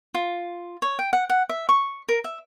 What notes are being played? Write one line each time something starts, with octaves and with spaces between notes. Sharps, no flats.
F4
C#5
G5
F#5
F#5
E5
C#6
A#4
E5